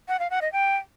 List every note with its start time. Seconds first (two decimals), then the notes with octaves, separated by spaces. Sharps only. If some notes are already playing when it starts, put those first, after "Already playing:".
0.08 F#5
0.19 F5
0.30 F#5
0.41 D#5
0.52 G5